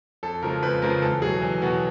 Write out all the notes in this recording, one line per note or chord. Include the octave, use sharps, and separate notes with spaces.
F2 A4
C#3 F3 G#3 A#4
F2 B4
C#3 F3 G#3 A#4
E2 A4
B2 F#3 G#4
E2
B2 F#3 F#4